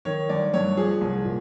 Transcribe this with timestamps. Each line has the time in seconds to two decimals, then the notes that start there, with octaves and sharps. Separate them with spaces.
0.05 D#3 C#5
0.29 G1 D5
0.54 G2 C#5
0.77 F3 G#4
1.01 C2
1.25 A#2